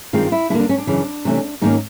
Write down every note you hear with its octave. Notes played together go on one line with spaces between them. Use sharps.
G2 D#3 G#3 C4 F4
E4
D3 G3 A#3 E4
D4
C#4
D4
F#2 C#3 E3
C3 E3 A3 C#4
G#2 D#3 F#3 A#3 C#4 D#4